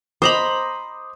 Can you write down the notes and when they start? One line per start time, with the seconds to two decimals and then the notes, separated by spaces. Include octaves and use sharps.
0.22 C5 D#5 A#5 B5 D6 D#6